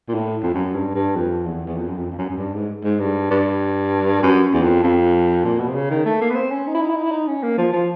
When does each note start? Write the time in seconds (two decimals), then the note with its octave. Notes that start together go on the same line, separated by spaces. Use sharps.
0.09 A#2
0.14 A2
0.43 F2
0.55 F#2
0.75 G2
0.95 G2
1.16 F2
1.46 E2
1.67 E2
1.76 F2
1.88 F#2
1.97 F2
2.12 F2
2.18 F#2
2.30 F#2
2.38 G2
2.54 G#2
2.84 G#2
3.00 G2
3.31 G2
4.23 F#2
4.53 E2
4.63 F2
4.84 F2
5.44 A#2
5.60 B2
5.68 C3
5.75 C#3
5.91 D#3
6.05 A3
6.22 A#3
6.30 B3
6.36 C4
6.51 C#4
6.67 D#4
6.75 E4
6.82 D#4
6.90 E4
6.97 D#4
7.04 E4
7.11 D#4
7.28 C#4
7.43 A#3
7.58 F3
7.73 F3